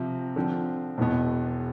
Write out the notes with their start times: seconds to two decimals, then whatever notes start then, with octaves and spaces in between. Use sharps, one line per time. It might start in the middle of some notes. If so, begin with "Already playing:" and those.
Already playing: C3 F3 C4
0.36 D3 F3 C4
0.98 E1 E2 B2 B3